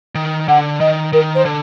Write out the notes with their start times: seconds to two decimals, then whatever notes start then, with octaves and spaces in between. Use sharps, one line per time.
0.15 D#3
0.48 D3 F#5
0.80 D#3 D#5
1.12 D#3 A#4
1.35 C5
1.45 D3